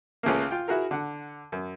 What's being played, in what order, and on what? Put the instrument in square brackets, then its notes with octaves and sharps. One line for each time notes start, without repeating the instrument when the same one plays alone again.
[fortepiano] C#2 C#3 A3 A#3
F4 G5
E4 F#4 G#4 A#4
D3 F#5
F#2